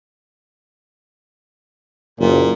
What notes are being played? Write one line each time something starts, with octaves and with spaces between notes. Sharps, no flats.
F#1 A#2